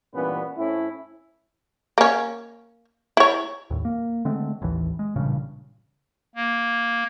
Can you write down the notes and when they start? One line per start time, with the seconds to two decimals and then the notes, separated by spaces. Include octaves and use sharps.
0.14 G2 A#2 E3 B3 C#4 B4
0.57 A2 C4 C#4 E4
1.98 A#3 C#4
3.17 E4 C#5
3.70 D#2 A2
3.85 A#3
4.25 D3 G#3 A3 C4
4.62 A1 D#2 E3
4.99 G#3
5.16 A1 G2 A#2 C#3
6.35 A#3